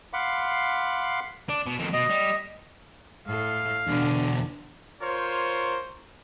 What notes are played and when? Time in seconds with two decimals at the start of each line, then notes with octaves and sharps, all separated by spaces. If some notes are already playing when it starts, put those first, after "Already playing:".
0.13 F5 F#5 B5 C6 D6
1.49 D4
1.66 B2
1.79 F2 D#3
1.93 B2 D#5
2.10 G3
3.27 A2 A4 F5
3.88 E2 B2 D3 D4
5.02 F4 A#4 C5 C#5